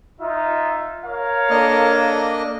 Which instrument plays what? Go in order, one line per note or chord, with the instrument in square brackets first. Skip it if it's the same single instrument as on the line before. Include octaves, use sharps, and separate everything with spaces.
[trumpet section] D#4 F4 E5
A#4 C#5 F5
[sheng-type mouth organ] A#3 D4 D#5 [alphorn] A4